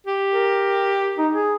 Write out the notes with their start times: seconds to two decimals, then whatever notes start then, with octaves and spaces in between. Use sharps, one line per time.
0.07 G4
0.32 A#4
1.18 D#4
1.33 G#4